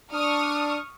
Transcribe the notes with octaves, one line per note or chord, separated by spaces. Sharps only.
D4 C#6 D#6 F6